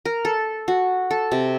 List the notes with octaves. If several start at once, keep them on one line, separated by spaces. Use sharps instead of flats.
A#4
A4
F#4
A4
C3